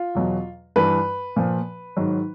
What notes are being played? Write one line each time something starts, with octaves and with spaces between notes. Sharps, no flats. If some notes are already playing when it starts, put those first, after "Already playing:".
Already playing: F4
E2 B2 F#3
G2 E3 B4
A#2 F3
G#2 D#3 F#3